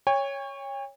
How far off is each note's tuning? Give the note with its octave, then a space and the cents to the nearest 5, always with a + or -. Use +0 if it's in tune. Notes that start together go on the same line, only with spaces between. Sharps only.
C#5 +0 G5 +45